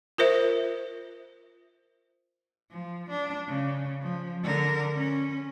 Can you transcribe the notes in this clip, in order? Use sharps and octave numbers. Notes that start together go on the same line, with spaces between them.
F4 A#4 C5 E5
F3
D4
C#3
F3
D3 A#4
C#4